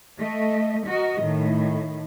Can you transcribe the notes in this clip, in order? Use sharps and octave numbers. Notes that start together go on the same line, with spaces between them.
A3 D#5
F#4 A#4 D#5
A2 D#3